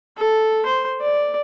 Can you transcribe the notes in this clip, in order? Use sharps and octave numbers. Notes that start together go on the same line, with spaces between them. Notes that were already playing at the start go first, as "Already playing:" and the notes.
A4
C5
D5